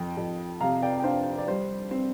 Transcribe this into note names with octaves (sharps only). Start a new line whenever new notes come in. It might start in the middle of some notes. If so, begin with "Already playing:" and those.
Already playing: F2 G5
F2
C3 F5 A#5
D5 G5
G5
D4 C5 F5
D5
G3 C5
C4